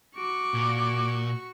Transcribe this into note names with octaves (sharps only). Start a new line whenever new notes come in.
F#4 C#6 D6
A#2